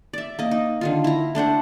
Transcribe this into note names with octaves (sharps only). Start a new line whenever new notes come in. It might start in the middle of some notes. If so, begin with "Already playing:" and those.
D5 E5
A#3 D#5
D#4
D3 D#3 F4
E4 A#5
A3 D4 C5 F#5